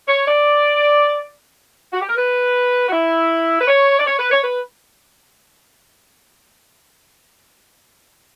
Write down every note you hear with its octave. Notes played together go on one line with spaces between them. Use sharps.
C#5
D5
F#4
G4
A#4
B4
F#4
E4
B4
C#5
D5
C#5
B4
C#5
B4